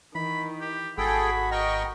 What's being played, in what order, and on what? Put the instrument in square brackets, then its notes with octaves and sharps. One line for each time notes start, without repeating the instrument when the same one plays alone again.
[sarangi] D#3 [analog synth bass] E3 [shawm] B5
[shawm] G4
[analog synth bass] G#1 [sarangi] F#4 [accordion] G#4 A4 G5 [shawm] B5
[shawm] A#4 [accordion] D#5 G5 C#6